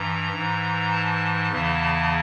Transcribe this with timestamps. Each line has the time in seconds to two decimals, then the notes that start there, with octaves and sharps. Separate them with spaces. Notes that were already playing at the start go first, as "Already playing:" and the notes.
Already playing: G2 E3 A#5
0.33 G#2 E3
0.92 A5
1.51 E2 C#3 E3